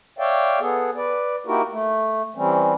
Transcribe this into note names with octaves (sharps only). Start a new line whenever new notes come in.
C#5 D5 E5 F5 G5
B3 G#4 A4
B4 D5
A#3 D#4 E4 F#4 G4 A#4
A3
E3 G3 C4 C#4